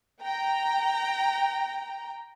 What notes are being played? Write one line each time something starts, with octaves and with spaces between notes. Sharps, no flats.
G5 A#5